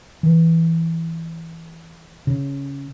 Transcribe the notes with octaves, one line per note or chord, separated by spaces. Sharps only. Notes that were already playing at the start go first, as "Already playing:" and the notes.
E3
C#3